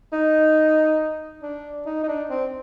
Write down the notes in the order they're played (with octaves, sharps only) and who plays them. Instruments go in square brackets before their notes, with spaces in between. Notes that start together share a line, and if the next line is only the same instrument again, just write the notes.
[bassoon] D#4
D4
D#4
D#4
D4
C4